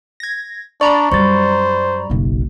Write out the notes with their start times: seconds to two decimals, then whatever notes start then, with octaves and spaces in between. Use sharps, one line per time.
0.20 G#6 A#6
0.81 D4 D5 A#5 B5 C#6
1.12 F#2 G3 C5 C#6 A6
2.10 F#1 B1